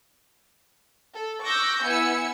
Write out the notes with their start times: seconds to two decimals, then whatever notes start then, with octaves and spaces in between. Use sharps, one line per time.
1.13 A4
1.43 C#6 D6 E6 F#6 G6 A#6
1.83 B3 E4 G#5 E6 C#7